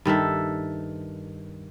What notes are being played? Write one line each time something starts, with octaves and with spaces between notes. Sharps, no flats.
G2 D#3 A4 E5